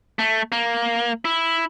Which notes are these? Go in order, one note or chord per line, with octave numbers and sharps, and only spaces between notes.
A3
A#3
E4